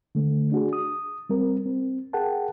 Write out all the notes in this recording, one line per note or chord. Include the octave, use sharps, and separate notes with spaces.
D3 A3
D4 F#4 G#4
D#6
G3 C4 A#4
C4
G#4 A#4 F#5 G5 A5